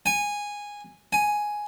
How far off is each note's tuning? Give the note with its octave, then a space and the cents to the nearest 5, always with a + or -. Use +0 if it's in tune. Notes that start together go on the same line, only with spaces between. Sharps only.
G#5 -10
G#5 +5